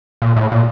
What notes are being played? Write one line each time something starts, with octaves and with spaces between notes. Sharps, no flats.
A#2
A2
A#2